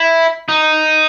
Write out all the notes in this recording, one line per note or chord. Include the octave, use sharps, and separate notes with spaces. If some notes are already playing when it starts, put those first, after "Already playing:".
Already playing: E4
D#4